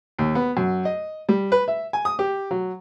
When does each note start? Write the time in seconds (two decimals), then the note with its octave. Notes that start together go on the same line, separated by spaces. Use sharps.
0.19 D#2
0.35 B3
0.57 F#2
0.85 D#5
1.29 G3
1.52 B4
1.68 E5
1.93 G#5
2.05 D#6
2.19 G4
2.51 F#3